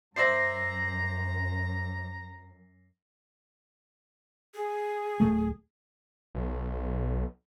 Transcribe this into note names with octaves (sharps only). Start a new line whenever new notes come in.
F#2 C5 D5 E5 A#5 A#6 C7
G#4
D1 A3
B1